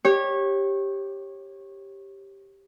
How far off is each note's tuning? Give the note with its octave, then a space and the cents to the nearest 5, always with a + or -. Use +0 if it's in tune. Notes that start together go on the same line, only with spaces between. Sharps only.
G4 +0 C#5 -25